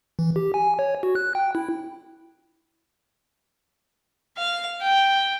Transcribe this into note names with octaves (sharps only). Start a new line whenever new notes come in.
E3
G4
G#5
C#5
F#4
F#6
G5
E4
F5
G5